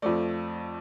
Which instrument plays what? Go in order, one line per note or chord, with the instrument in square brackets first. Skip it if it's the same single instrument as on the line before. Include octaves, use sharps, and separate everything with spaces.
[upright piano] F2 F3 A3 D5